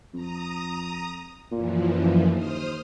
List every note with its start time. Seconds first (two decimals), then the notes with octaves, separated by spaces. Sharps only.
0.14 F2 A#5 D#6
1.52 F#2 A#2 E3 F3
2.34 D#2 C5 D#6 F6